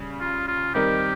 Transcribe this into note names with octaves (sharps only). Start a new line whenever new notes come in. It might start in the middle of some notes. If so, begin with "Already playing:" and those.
Already playing: C#3 G3
F4
F4
D#3 G3 C4 D#4 G4 A#4